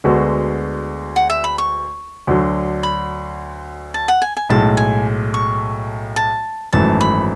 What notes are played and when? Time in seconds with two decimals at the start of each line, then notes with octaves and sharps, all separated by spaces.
0.04 D2 D3 G#3 B3 F#4
1.16 F#5
1.30 E5
1.44 B5
1.58 C#6
2.27 D2 D3 F#3
2.83 B5
3.94 A5
4.08 F#5
4.22 G#5
4.37 G#5
4.49 B1 A2 G#3 A5
4.77 G#5
5.34 C#6
6.16 A5
6.73 G#1 F#2 E3 A3 A5
7.01 B5